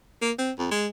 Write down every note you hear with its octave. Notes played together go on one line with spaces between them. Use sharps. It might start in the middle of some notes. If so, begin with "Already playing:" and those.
A#3
C4
F2
G#3